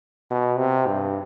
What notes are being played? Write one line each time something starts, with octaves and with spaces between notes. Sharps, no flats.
B2
C3
G2